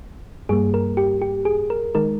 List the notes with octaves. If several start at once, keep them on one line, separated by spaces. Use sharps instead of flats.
G2 G3 A#3 G#4
A#4
G4
G4
G#4
A#4
D#3 G#3 D#4 A#4